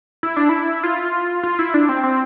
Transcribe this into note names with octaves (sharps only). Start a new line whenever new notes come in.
E4
D4
E4
F4
F4
E4
D4
C4
C4